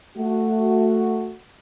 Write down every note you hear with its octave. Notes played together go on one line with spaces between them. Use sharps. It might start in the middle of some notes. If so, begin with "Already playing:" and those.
A3 F#4